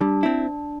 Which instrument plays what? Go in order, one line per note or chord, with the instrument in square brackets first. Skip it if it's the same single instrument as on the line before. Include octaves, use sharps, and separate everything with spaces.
[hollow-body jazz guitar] G3 [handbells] D4
[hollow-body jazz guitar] C4 E4